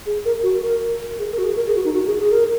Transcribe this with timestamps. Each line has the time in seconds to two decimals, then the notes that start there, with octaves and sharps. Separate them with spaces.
0.06 G#4
0.25 A#4
0.43 F#4
0.62 A#4
1.19 G#4
1.32 A#4
1.38 F#4
1.44 G#4
1.56 A#4
1.67 G#4
1.76 F#4
1.85 D#4
1.94 F#4
2.07 G#4
2.19 G#4
2.32 A#4